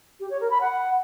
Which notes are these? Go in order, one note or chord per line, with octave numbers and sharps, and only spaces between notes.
G4
C#5
A#4
B5
F#5